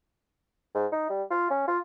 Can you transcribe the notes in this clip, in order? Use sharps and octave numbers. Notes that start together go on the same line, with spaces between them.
G#2
D#4
G3
F4
C#4
F4